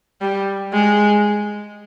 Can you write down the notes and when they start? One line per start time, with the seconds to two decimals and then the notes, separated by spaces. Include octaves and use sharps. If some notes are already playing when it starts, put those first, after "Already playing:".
0.21 G3
0.73 G#3